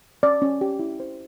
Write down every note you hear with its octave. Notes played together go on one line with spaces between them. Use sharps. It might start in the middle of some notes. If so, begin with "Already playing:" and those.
C#4 D5
C#4
G4
E4
C5